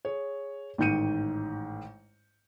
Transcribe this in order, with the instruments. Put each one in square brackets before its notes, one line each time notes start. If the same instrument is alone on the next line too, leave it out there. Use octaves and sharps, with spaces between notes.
[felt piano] G#4 C#5
A1 G#2 D#3 G6 C#7 D#7